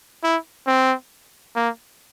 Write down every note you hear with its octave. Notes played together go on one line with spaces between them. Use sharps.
E4
C4
A#3